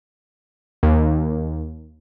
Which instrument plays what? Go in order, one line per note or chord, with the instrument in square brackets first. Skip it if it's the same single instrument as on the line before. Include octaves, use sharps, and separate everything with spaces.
[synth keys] D#2